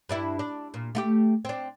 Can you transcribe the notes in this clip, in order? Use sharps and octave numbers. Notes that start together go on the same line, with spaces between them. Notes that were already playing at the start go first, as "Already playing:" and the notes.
G2 D4 E4
D4
A#2
A3 F4 G4
C4 D4